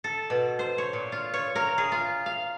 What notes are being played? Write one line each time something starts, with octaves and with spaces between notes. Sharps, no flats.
A4
B2
C5
C#5
A#2
F4
C#5
A#4
G#4
F4
F5